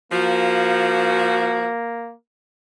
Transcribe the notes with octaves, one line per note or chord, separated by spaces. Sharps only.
F3 A#3 F#4